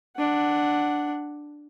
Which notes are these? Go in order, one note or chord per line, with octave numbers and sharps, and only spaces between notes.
D4 F#5